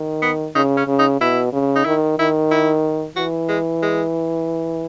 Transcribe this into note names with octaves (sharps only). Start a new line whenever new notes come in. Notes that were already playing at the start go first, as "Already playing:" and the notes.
Already playing: D#3
B3
C#3 D#4
C#4
C#3
D#4
B2 E4
C#3
D#4
D#3 E4
D#3 E4
E4
E3 F#4
G#3
G#3